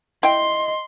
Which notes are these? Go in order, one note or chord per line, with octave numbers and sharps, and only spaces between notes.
E4 D#5 G5 C6